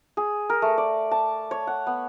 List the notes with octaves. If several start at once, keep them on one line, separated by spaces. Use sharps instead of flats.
G#4
A#4
A3
D5
A5
C#5
F#5
B3